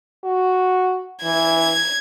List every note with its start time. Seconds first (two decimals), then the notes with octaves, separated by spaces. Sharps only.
0.24 F#4
1.24 E3 G#6